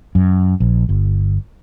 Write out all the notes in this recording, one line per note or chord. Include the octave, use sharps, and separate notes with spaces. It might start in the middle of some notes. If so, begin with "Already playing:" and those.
F#2
A#1
G1